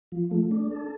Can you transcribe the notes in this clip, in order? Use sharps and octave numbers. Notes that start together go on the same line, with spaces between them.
F3
A3
D4
A4